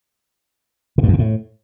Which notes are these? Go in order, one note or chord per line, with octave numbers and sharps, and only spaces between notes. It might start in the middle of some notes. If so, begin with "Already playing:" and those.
B2
G2
F2
B2
A2